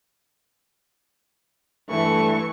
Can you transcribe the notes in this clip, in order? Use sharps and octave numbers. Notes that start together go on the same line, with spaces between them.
G2 E3 A3 C#6